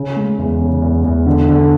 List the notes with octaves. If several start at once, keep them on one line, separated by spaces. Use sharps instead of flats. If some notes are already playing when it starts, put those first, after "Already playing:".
Already playing: C#3
G#3
E2
C#3
E2
E2
D3
D3